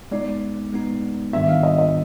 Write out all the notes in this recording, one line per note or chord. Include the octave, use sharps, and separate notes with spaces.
G#3 B3 D#4 D5
G#3 B3 D#4
G#2 D#3 G3 B3 D4 E5
F5
D#5
D#5